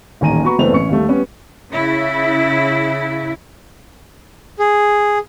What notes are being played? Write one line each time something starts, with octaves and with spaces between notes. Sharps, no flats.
D#1 A1 D#3 G#5 A#5 D#7
B3 F#4 A#5 B5 C#6
F#1 E3 A3 B3 C4 F7
A1 C#4 C#6 C#7
D#2 G3 A3
G3 B3 C#4
C#3 E4
G#4